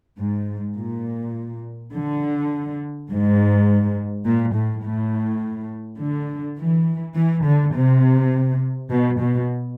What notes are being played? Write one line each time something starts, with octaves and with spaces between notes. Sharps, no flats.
G#2
A#2
D3
G#2
A#2
A2
A2
D3
E3
E3
D3
C3
B2
B2